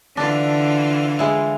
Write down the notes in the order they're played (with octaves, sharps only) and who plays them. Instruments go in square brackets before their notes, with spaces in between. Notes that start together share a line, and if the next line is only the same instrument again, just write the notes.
[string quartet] D3 E3 F4 [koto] D4
[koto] G#3 E4